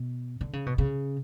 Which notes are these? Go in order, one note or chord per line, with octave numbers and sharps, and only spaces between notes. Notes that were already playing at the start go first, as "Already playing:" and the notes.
Already playing: B2
D3
C#3
B2
C#3